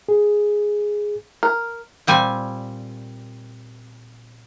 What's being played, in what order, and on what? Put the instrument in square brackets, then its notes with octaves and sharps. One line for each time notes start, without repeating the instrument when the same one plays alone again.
[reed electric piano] G#4
[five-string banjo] A#4
[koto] A#2 G3 C4 G#5